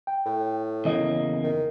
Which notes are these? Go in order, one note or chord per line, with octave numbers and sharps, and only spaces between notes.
G5
A2
E2 C#3 E3 A#3 D#5
D#3